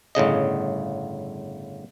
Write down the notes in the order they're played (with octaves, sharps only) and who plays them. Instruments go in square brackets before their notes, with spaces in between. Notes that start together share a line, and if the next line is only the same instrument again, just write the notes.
[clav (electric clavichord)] G1 A2 C#3 D#5